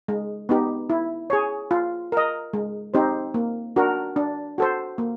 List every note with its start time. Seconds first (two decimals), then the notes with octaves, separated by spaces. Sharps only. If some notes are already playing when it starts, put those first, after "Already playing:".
0.08 G#3
0.49 B3 D#4 G4
0.90 E4
1.30 G#4 C#5
1.71 F4
2.12 A#4 D#5
2.53 G#3
2.94 C4 D#4 G4 C5
3.34 A#3
3.76 D4 F#4 A#4
4.16 D4
4.58 F#4 A4 C5
4.98 A#3